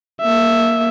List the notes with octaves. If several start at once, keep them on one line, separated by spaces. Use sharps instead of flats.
A#3 E5